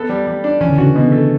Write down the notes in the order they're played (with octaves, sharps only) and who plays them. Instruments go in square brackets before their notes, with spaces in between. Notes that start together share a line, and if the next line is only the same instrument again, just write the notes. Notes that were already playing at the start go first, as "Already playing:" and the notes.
Already playing: [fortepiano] B3 A4
G3
G3
D4
[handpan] E3 [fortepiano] C#4
[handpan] D3
[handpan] C#3 [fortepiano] F#4
[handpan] D3
[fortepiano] B2
A3